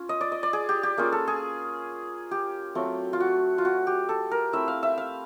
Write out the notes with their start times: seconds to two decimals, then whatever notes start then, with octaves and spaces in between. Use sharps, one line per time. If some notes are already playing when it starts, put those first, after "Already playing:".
Already playing: C#4 F4
0.09 D#5
0.21 D5
0.32 D#5
0.43 D5
0.53 G#4
0.69 G4
0.83 G4
0.97 A#3 C#4 F4 G#4
1.12 A4
1.27 G#4
2.31 G4
2.75 F#3 A3 C4 F4
3.13 F4
3.20 F#4
3.58 F4
3.65 F#4
3.87 G4
4.09 A4
4.31 A#4
4.53 A3 C4 E4 E5
4.68 F5
4.83 E5
4.98 F5